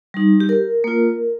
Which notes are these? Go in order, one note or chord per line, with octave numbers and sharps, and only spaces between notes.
G3 D#4
G4
A#4
A#3 F4